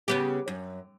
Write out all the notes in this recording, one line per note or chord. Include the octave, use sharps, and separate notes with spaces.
C#3 B3 G4
F#2